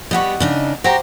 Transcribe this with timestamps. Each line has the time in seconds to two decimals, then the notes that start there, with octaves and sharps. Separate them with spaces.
0.11 G3 B3 G4 D#5 F#5 C#6
0.40 C#3 D4 D#4
0.84 F#4 G4 C5 A#5